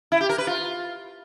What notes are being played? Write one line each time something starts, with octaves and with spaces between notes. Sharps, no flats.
E4
G4
A#4
B4
F4